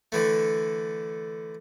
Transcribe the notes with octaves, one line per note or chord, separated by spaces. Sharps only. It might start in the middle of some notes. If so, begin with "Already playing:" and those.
D3 E3 A3